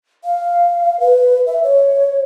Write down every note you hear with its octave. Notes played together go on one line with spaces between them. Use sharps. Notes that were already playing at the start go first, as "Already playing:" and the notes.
F5
B4
E5
C#5